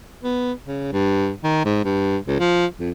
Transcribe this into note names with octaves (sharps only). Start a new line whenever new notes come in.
B3
C#3
G2
D#3
G#2
G2
C#2
F3
F2